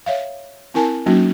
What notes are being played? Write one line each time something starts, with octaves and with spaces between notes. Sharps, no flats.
C#5 E5 F5
C4 E4 A#4 G#5 A5
F#3 A#3 C#4 D#4 F#4